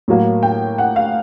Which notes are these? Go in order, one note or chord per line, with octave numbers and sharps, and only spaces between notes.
A2 F#3 A#3
G5
F#5
F5